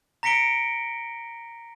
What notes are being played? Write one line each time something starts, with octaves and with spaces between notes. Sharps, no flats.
A#5 A#6 B6 C#7 D7 G7